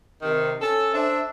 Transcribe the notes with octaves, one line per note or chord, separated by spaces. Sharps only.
C3 D#3
C#4 A4
D4 C5 E5